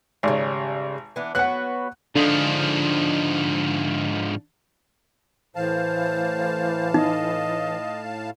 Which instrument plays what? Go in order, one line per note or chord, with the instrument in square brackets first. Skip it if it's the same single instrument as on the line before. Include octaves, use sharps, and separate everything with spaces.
[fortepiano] G#1 [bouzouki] C#3 G3
[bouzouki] E3 B3 D4
[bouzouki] F#3 B3 F#4 [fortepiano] F#5 F#6
[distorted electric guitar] G#2 F3 [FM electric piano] D3 D#6 [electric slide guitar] D4 F5
[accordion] A2 F5 A5 [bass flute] E3 [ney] C5
[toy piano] D#4 [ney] D#5